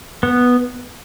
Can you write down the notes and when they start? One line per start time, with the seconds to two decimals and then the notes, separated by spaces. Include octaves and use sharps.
0.23 B3